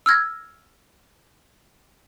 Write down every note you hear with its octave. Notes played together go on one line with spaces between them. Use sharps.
E6 F6 G#6 A#6